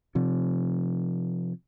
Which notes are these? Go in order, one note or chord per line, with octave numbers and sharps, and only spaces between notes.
C3 F3